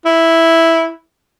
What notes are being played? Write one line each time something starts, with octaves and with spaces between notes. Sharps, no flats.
E4